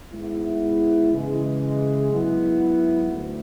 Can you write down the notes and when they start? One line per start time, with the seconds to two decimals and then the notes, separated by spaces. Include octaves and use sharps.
0.12 G#2 G#3 B3 E4
1.12 C#3 E3 G#3
2.12 G#2 F#3 B3 E4
3.12 D2